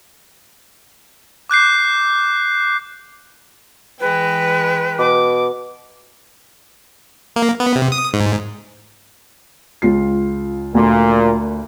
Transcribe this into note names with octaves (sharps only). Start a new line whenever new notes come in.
D6 F#6 G6 C7
E3 G#3 B4 G5
B2 D6
A#3
B3
C3
D#6
G#2
C#2 F4 C7
D2 A#2